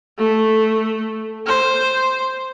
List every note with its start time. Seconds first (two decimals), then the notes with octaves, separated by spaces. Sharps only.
0.18 A3
1.47 C5